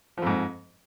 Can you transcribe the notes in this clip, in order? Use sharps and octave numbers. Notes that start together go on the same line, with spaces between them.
F2 G#2 F3